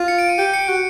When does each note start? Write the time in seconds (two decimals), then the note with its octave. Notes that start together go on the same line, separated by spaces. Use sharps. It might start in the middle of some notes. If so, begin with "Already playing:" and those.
Already playing: F4
0.08 C#7
0.19 D7
0.29 D#7
0.38 G4 D7
0.54 C#7
0.69 F#4